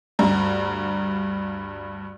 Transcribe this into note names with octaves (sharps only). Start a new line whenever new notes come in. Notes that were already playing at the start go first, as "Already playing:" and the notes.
D2 G2 A#5